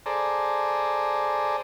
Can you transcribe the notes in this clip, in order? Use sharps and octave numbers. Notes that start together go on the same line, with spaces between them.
G#4 A4 C5 D5 A#5